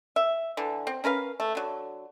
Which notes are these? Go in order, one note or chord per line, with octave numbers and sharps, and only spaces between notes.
E5
D3 E3
C4
C#4 A#4 B4 F5
A3
D3 F#3